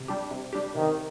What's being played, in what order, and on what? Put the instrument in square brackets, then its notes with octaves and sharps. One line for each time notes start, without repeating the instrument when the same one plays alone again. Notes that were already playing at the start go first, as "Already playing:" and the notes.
Already playing: [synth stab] C3
G3 D4 G4
C3
G3 D4 G4
[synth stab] C3 [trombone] D#3